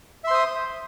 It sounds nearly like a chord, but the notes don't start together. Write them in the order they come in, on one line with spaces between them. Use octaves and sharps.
E5 C6 C5 D#6